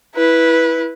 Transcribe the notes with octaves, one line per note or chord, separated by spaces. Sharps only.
E4 B4